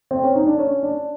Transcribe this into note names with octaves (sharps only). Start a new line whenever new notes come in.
C4
C#4
D#4
D4
C#4
D4